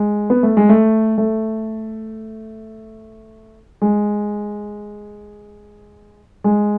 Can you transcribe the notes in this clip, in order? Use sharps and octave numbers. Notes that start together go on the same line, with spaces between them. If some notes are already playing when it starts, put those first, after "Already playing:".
Already playing: G#3
B3
A3
G#3
A3
A3
G#3
G#3